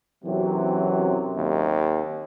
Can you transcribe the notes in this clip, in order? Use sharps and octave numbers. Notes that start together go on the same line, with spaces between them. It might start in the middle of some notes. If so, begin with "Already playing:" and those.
B1 F#2 C3 E3 F#3
D#2